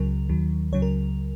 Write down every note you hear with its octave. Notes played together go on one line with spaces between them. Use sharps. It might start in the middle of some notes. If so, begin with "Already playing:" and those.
Already playing: C#2 C#3 F#3 A#4
D#2 D#3 F#3
C#2 C#3 F#3 C#5
A#4